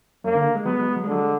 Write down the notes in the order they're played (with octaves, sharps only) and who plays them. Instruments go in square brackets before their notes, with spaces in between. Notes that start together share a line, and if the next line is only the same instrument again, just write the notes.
[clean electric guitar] F#2 [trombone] A#3
[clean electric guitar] D3
G#3
[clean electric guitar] F#3 [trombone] B3
[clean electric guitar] G#3
F#3
G#3
F#3
G#3
[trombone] D3 [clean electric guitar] F#3
[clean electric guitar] G#3